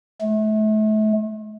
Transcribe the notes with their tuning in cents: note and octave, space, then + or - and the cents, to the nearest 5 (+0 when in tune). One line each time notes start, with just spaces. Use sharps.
A3 -35